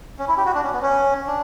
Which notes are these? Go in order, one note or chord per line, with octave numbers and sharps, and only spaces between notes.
C#4
E4
G4
F#4
D4
C#4
B3
C#4
D4